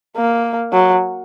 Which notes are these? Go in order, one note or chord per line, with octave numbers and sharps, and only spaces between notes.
A#3
F#3